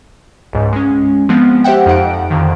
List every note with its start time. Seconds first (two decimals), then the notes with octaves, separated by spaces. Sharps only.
0.53 C#2 G#2
0.73 G#3 C#4
1.29 F3 G#3 B3 C4
1.64 G4 C5 E5 F#5 G5
1.86 F2 D#4 F#5 D7
2.30 F2 D3 D#3